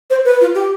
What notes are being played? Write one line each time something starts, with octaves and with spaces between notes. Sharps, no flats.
C5
B4
F4
G4